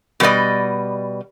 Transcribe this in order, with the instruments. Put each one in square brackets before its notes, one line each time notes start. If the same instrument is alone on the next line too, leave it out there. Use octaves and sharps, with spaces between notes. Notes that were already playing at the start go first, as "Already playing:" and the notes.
[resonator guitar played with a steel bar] B2 G3 B4 D5 D#5